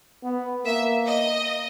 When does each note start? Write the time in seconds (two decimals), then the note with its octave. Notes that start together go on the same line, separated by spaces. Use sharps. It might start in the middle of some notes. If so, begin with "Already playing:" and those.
0.24 B3
0.65 A#3 E5
1.06 D#5